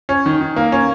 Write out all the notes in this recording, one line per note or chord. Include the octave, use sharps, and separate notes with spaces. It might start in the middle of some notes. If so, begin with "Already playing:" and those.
C#4
D#3
D#3
A#3
C#4